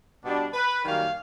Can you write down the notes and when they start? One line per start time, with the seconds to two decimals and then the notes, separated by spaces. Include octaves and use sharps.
0.24 B2 G3 B3 D4
0.54 B4
0.84 F#2 D#3 G3 A#3 C#4 F5